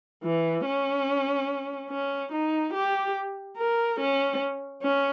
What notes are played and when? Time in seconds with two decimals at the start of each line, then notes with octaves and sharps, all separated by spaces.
0.23 E3
0.65 C#4
1.91 C#4
2.32 D#4
2.74 G4
3.58 A#4
4.00 C#4
4.82 C#4